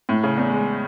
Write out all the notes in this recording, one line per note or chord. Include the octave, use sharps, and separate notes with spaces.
A2
C#3
E2
G#3